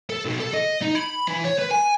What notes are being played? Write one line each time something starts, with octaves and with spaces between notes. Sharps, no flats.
A4
B1
A4
D#5
D#4
B5
E3
C#5
B4
G#5